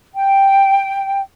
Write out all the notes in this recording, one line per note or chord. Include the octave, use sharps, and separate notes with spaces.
G5